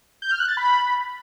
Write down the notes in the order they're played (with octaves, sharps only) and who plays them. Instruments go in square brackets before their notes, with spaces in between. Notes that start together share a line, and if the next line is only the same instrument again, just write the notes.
[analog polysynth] G6
F6
F#6
A6
B5